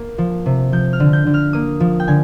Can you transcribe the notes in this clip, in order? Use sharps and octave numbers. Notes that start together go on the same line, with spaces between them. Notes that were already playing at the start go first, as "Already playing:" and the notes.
Already playing: A#3
F3
C3
F3 G6
F6
D3
G6
D3
F6
A#3 D#6
F3
G5
D3 G#5